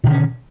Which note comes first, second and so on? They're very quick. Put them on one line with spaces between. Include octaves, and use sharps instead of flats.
B2 D3 D#3 C#4